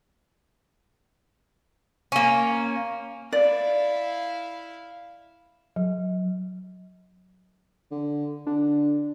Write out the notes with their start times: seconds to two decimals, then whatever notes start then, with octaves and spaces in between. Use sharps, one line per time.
2.12 A#3 C#4
3.33 E4 D5 F5
5.76 F#3
7.91 D3
8.47 D3 D4